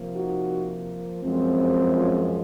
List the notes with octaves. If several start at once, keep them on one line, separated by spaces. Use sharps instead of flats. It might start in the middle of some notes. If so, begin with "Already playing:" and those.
Already playing: C3 F3 A#3
D#4 F#4
F#2 F3 G#3 C4
C#4 F4